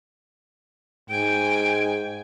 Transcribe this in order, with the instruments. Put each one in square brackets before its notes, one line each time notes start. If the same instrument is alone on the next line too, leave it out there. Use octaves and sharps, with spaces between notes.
[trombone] G#2 [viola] G5 G#5 [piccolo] D7